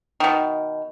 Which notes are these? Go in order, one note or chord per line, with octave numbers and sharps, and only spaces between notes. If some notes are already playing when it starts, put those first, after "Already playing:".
B2 D#3